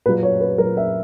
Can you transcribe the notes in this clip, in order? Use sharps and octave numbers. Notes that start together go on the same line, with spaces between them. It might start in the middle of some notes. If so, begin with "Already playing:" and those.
A#2 F#3 B4
C#5
B4
A#2 F#3 A#4
E5